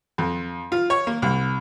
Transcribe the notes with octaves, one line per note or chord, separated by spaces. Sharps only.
F2
F4
C#5
A#3
C2